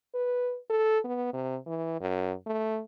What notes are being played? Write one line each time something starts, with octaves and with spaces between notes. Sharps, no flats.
B4
A4
B3
C3
E3
F#2
A3